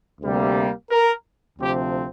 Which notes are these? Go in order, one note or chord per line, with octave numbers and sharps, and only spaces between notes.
D2 C3 G3 A#3
A#4
D2 C3 F3 C4 G4